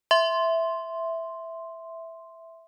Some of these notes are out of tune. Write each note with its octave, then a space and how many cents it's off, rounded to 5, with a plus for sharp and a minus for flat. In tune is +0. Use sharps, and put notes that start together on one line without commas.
E5 +0 C6 +0